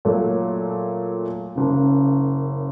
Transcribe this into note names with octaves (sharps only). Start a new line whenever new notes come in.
A#2 F#3 A3
F#1 F#2 C#3